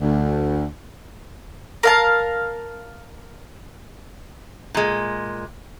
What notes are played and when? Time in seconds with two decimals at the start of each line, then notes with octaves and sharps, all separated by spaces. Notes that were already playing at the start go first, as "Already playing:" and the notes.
0.01 D2
1.83 A#4 F5 A5
4.75 A#2 G#3